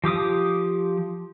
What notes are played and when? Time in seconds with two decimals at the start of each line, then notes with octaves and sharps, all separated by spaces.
0.04 F3 G4 D6 D#6